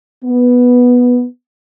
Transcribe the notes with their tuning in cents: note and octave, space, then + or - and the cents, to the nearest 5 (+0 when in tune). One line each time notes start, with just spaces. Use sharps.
B3 -5